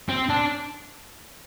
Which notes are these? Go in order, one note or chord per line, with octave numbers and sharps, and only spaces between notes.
C4
D4